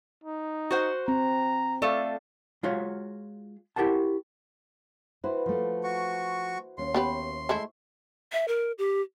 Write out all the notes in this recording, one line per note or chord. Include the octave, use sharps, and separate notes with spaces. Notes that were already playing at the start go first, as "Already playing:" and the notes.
D#4
F#4 C5 F#5
C4 A#5
A3 A4 D5 F5
G#3 F4 F#4 C#5 F5
E4 G4 A#4 F#5 A5
E3 E4 F#4 B4 C5
F3 A3 C5
F#4 C#6
D#2 C#4 C6
B3 G4 B4 E5 C#6
G#3 A3 E4
E5
A#4
G4